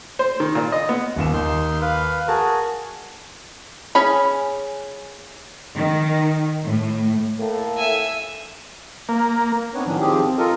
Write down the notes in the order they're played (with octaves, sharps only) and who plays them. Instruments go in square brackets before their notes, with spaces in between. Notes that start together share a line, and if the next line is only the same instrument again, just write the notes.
[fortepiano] C5
D#3
A#2
D#5
B3
[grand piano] D#1 D#2 E7
[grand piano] D#2 [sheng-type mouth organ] D#4 C6
[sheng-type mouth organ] B4 F5
[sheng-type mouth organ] F#4 G#4 [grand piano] A#4 A5
[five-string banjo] C#4 G#4 B5
[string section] D#3
A2
[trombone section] A2 A#3 A4
[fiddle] E5 G#5
[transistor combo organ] A#3
[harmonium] B3 C4 D4 D#4 B4 C#5
A2 D#3 F3 F#3 C#4 D4
D#3 F3 C4 G4 G#4
C4
F4 A4 A#4 D#5